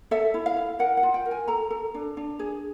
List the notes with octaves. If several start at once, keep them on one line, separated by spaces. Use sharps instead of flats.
A4 E5
E4
F5
E4
A#4 F#5
F#5
F4
G5
A#4
G#5
A4 A#5
A4
D4
D4
G#4